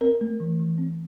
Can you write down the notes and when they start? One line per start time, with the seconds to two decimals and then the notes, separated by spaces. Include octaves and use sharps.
0.01 C4 A#4
0.21 A3
0.40 E3
0.60 E3
0.78 C4